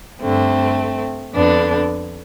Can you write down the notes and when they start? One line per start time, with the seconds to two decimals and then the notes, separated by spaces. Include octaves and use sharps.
0.21 G2 D3 A3 C4
1.35 F2 D3 B3 D4